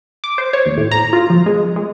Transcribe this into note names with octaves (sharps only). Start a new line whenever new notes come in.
D6
C5
C#5
D#2
A2
A#5
F4
F3
G#3
G#3